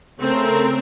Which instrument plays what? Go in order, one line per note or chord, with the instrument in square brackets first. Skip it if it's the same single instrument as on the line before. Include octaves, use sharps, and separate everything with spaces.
[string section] C#3 A3 C4 A#4